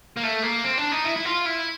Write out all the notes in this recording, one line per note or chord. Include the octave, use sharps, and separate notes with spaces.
A#3
A3
A#3
C4
D4
D#4
E4
E4
F4
E4